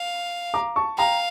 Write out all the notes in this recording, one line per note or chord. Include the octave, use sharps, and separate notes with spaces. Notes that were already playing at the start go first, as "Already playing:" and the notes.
Already playing: F5
A#5 D6
A5 C#6
F5 G5 A#5